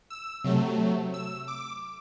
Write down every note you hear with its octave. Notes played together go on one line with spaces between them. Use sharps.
E6
C3 F#3 A3
E6
D6